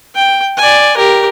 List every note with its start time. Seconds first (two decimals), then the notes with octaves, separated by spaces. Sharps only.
0.15 G5
0.57 D5 G#5
0.97 G4 A#4